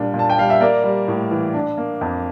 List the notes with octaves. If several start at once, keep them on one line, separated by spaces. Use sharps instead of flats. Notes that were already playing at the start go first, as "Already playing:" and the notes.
Already playing: A#2 G3 D4
A#2
A5
G5
G3 F5
E5
A#3 A#4 D5
G3
A2
E3
D4
A#3
F2